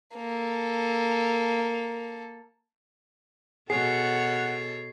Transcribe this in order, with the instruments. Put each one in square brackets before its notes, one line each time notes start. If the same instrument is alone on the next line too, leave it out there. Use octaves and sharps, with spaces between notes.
[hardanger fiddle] A#3 A4
[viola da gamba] B2 A4 C#5 [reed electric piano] G#4 [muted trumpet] F#5 [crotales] C7